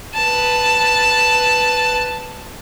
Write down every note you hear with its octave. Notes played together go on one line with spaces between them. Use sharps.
B4 A5